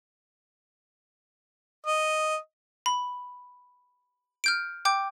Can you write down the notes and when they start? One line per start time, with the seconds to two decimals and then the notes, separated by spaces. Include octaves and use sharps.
1.87 D#5
2.86 B5
4.44 F6 G6 D7
4.85 G5 D6 G6